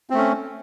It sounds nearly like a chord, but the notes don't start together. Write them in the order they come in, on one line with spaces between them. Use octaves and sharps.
C4 A3 C#4